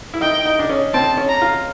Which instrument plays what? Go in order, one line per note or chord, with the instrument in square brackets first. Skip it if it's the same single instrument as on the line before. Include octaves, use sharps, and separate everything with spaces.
[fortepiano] E4
[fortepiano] D#4 [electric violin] G5
[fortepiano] D#4
D4
C#4
[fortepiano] C4 [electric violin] A5
[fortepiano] C#4
[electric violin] A#5
[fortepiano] F4